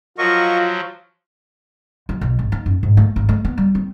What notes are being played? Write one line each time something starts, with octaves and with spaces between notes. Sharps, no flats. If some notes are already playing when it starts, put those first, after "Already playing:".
F3 F#3 F4 A#4 D#5 C#6
F#2
B1
G#1
D#4
F#2
G#2
A3
G#1
A3
B3
G3
C4